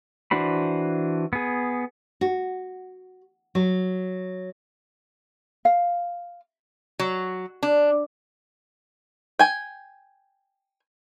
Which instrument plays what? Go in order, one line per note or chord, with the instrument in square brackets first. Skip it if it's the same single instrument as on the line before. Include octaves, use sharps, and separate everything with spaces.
[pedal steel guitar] E3 D4 F#4 C5 B5
B3 G#4
[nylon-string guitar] F#4
F#3
[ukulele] F5
[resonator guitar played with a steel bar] F#3
D4
[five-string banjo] G5 G#5